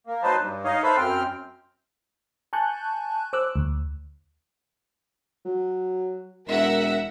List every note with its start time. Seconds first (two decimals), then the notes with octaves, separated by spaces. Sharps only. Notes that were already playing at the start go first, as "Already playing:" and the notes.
0.07 A#3
0.23 F#3 D#4 B4 C5 A5
0.39 G2
0.65 D#4 C#5 D#5 F5
0.84 A4 B4 C5 E5 F5 B5
0.97 F#2 C4 G5 F6
2.53 G#5 A5 C#6 F#6 G6
3.33 C5 D6 E6 F#6
3.56 D2
5.45 F#3
6.48 E1 A#4 E5 F#5